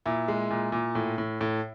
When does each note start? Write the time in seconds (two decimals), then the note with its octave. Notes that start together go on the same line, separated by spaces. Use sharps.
0.06 A#2 E4
0.28 G#3
0.50 A#2
0.72 A#2
0.95 A2
1.18 A2
1.41 A2